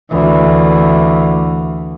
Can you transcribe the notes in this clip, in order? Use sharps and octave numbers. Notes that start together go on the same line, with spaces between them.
D2 E3